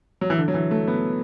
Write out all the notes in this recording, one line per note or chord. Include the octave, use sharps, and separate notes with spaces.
F#3
E3
D3
F#3
E3
A3
B3